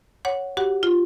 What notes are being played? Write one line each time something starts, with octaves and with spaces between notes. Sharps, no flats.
C#5 F#5
F#4 G4 F#5
F4